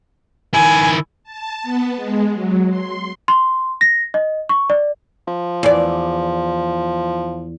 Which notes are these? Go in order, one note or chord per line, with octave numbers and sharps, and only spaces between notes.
D#3 E4 G#5
A5
B3
G#3
F#3
C6
C6
A#6
D#5
C#6
D5
F3
E2 D5